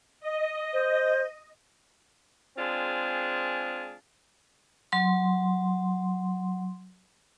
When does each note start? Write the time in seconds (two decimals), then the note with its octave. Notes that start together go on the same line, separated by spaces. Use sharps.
0.20 D#5
0.73 C5
2.58 G#3 C4 D4 F4 G#4
4.92 F#3 C6